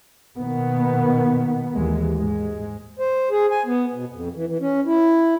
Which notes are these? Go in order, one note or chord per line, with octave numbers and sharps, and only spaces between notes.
B2 D#3 A#3 B3
D#2 E3 G#3
G#2 G#3
C5
G#4
G#5
B3
B2
F2
E3
E3
C#4
E4